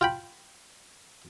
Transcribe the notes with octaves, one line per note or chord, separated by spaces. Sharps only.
F4 G5 B5